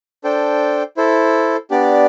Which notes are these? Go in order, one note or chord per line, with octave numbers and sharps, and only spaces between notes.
D4 A4 C5 G5
E4 A4 C5
B3 D4 G4 D5